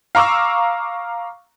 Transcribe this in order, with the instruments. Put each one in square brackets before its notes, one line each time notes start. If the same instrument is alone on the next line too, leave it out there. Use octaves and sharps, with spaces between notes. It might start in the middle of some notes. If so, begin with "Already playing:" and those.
[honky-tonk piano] F5 A#5 C#6 D6 E6